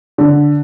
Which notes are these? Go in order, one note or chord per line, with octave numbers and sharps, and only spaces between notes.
D3